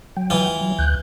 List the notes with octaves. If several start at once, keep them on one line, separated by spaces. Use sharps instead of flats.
F#3 G5
E3 F4
F#3
D2 F#6 G6